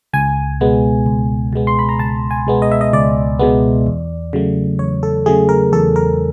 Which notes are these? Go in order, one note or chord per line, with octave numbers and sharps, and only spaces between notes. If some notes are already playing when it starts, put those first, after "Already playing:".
C#2 G#5
B2 G#3 B3
C#2
B2 G#3 B3
C6
B5
A#5
C#2 A5
G#5
B2 G#3 B3
D#5
E5
D#5
C#2 D5
B2 G#3 B3
E2
C#3 F#3 A3
E2 C#5
A4
C#3 F#3 A3 G#4
A#4
E2 A4
A#4